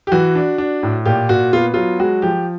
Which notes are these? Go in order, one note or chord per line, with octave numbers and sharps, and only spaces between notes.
G4
E3 F#4
D4
D4
A2
A#2 G4
A#2 F#4
B3 F4
F#3 F4
G#3 F#4
F3 G4